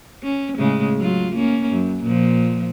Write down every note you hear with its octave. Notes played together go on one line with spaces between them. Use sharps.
C#4
A2 C#3 G#3
F#3 F4
A#3 C#4
F#2
A#2 F3